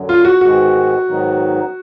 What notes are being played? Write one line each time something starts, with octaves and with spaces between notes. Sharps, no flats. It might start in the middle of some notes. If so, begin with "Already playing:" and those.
Already playing: F#2 D3 F#3
F4
F#4
G#2 D#3 G#3 B3 F#4
G#2 D#3 F#3 B3 D#4